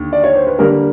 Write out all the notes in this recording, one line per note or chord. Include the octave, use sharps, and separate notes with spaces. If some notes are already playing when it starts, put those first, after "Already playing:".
Already playing: D#2 D3
D5
C#5
C5
B4
D3 G3 A#3 A#4